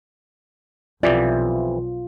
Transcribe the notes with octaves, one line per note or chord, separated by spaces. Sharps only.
B1 F2 C3 E3 F4 D5